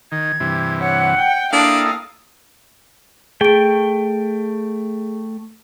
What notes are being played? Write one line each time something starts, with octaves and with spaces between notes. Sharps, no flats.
D#3 G#6
G2 C3 E3
C#5 F#5
G5
A#3 D4 E4 A4 F5 D#6
A3 G#4 G5 D7